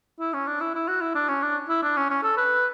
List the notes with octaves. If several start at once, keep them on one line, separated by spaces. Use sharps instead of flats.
E4
C#4
D4
E4
E4
F#4
E4
D4
C#4
D4
E4
D4
C#4
C#4
A4
B4